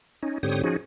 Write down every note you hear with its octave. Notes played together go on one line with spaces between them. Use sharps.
C#4 D#4
G#2 D3 C4 G4 C#5 D#6
F3 C#4 D#4 F#4 G#4